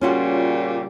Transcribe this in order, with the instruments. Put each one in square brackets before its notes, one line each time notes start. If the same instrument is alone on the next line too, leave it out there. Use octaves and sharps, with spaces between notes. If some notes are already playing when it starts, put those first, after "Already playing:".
[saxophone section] A#2 C#3 G3 [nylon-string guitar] C#4 F4 F#4